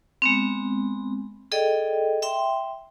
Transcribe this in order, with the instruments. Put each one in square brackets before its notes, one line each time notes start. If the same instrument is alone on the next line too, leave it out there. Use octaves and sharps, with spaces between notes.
[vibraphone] G#3 B3 C4
G#4 A4 D5 D#5 G5
E5 G5 C6